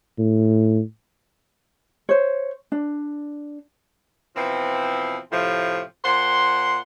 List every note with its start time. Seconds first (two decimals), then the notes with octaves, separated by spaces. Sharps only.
0.19 A2
2.09 C5 C#5
2.72 D4
4.36 B2 E3 F3 C4
5.31 A2 C3 F3
6.04 A#2 C5 F#5 C6